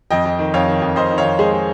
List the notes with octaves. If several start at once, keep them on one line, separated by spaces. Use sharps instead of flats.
F2 D#5 G5
F2
D#3
F2 C#5 F5
D#3
F2
F2 C5 D#5
D#3
C#5 F5
F2
G#3 G#4 C5
G#3